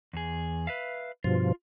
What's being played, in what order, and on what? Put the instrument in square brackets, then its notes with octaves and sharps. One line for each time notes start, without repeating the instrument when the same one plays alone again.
[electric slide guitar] E2 G#4
B4 E5 F5
[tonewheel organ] G2 B2 F3 [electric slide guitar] F4